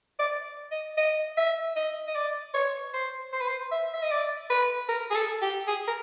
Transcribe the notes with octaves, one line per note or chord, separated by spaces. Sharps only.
D5
D#5
D#5
E5
D#5
D#5
D5
C#5
C5
C5
B4
C5
E5
E5
D#5
D5
B4
A#4
G#4
A4
G4
G#4
A#4